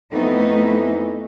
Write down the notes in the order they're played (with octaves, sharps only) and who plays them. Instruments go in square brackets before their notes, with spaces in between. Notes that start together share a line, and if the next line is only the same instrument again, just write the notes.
[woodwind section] F2 E3 [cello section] A3 B3 D#4